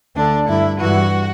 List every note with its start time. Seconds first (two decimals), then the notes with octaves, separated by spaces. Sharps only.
0.16 D2 D3 D4
0.48 G2 D3 E4
0.80 G2 E3 F#4